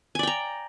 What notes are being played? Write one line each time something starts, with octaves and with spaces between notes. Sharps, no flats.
D5 G5 G#5 A#5